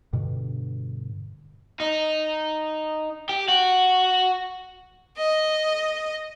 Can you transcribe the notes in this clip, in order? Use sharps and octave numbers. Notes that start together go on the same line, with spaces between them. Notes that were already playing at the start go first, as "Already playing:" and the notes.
G2 B2 D3
D#4
G4
F#4
D#5